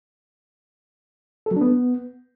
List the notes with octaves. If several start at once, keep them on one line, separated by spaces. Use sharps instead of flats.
A4
F#3
D4
B3